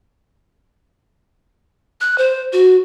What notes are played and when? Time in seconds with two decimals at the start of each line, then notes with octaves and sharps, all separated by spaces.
2.01 F#6
2.18 C5
2.53 F#4